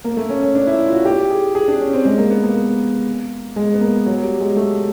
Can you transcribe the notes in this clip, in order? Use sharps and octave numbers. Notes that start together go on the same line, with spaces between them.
A#3
A3
C#4
C#4
D4
E4
F4
F#4
G4
G#4
G#4
D4
C#4
C4
G#3
A#3
B3
A#3
G#3
B3
A#3
F#3
G3
G#3
A3